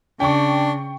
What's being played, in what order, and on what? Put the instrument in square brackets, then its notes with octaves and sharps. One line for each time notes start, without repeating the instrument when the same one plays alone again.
[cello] C#3 [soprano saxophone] D4 [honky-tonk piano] G5 C#6